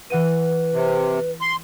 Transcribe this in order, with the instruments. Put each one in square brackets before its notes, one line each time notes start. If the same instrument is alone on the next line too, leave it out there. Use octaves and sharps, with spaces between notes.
[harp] E3 F#5 D#7 [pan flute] B4
[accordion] C3
C6